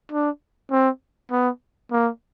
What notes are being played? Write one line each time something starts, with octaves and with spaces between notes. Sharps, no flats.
D4
C4
B3
A#3